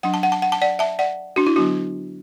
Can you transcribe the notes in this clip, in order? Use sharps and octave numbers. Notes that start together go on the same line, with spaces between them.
F#3 D4 F#5
A5
F#5
A5
F#5
A5
D5 F#5
E5 A5
D5 F#5
D4 F#4
E4
D3 F#3 B3 D4 F#4